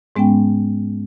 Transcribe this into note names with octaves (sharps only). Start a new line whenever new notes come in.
G#2 G#3 B3 C#4 G5